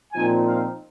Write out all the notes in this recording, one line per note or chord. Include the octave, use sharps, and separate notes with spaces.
A#2 F3 C4 D#4 G#5
F5